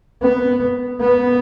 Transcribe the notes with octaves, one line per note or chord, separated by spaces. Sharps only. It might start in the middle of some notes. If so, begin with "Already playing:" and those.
B3
B3